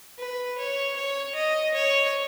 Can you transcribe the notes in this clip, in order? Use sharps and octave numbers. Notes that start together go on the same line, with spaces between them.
B4
C#5
C#5
D#5
C#5